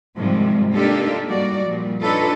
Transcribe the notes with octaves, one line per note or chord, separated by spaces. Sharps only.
G#2 C3 D#3 F3 G3 G#3
A#3 D4 D#4 F4 G4 A4
G3 A#3 D#4 F#4 D5
A#2 F3 G3
D4 D#4 F4 A4 B4 C#5